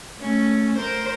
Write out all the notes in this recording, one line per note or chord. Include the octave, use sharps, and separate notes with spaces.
A3 C#4
A#4 C5